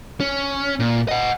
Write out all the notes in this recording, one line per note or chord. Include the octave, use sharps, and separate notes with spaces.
C#4
A#2
D#5 F#5